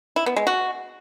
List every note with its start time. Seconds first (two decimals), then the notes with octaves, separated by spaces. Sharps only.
0.16 E4
0.26 B3
0.36 G#3
0.47 F#4